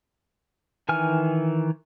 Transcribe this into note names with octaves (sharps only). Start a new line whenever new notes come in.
D#3 E3 G#5 F6